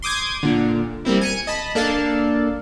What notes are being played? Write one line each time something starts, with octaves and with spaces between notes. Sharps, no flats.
C6 D6 D#6 G6 G#6
A#2 D3
G3 A#3 C4 E4
G#5 C#7 D#7
D#5 A5 B5
A#3 D4 A4 F5 A5